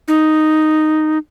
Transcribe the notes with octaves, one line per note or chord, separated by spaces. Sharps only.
D#4